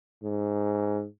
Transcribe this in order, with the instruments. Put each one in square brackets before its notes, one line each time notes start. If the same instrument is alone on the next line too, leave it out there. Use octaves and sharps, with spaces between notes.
[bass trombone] G#2